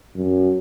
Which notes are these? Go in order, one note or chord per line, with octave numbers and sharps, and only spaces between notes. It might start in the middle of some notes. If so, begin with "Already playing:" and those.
F#2